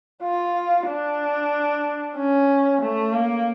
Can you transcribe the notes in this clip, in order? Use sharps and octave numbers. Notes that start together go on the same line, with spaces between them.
F4
D4
C#4
A3
A#3